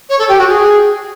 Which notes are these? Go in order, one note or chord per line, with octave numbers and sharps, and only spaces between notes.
C#5
A4
G4
F#4
G#4